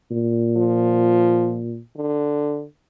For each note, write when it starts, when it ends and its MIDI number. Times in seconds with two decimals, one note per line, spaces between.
0.11 1.78 46
0.57 1.61 53
1.97 2.64 50